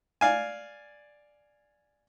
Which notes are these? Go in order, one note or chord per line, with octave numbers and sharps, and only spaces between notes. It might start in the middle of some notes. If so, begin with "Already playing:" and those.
D5 F5 G#5